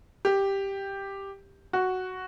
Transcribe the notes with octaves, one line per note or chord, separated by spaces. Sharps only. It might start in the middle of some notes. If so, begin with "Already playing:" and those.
G4
F#4